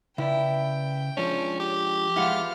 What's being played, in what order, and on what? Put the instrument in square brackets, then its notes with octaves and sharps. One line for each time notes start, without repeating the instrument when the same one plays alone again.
[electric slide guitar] C#3 B4 D5 [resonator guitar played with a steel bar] E4 [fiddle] G5
[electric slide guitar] F3 G#3 D4 [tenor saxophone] C#4
[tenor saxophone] G4
[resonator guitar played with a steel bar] E2 F#5 [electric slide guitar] F3 G#3 E4 [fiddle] F4 F6